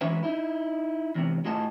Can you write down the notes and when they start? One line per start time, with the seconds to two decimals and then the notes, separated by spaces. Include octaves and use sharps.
0.01 E3 G#3 C#4 F#4 B4 E5
0.23 D#4 E4
1.15 E2 C3
1.45 A2 F4 F#4 G#4 D#5 A5